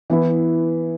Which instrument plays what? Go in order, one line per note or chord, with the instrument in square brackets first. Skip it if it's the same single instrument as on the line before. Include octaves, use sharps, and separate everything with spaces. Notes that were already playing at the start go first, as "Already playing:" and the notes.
[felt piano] E3 B3 E4